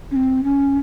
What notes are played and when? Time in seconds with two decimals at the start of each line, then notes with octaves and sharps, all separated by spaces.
0.11 C#4
0.16 C4
0.44 C#4